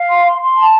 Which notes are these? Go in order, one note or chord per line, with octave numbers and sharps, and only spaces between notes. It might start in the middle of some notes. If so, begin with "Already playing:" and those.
Already playing: F5
C6
C6
C6
A5